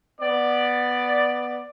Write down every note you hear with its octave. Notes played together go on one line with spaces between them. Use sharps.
B3 D5